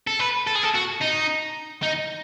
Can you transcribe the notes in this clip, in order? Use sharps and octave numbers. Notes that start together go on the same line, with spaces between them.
A4
B4
A4
G#4
A4
F#4
D#4
D#4